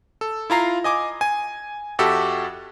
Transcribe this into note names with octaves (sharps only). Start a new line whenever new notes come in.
A4
E4 F4 A#5 C7
D#5 G#5 D6
G#5
F2 F#4 G4 A4 E5